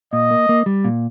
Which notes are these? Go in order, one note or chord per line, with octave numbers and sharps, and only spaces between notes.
A#2 D#5
A#3
A#3
G3
A#2